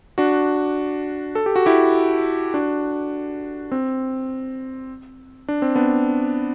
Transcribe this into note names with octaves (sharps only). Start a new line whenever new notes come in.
D4 F#4
A4
G4
F#4
E4 G4
D4 F#4
C4
D4
C4
B3 D4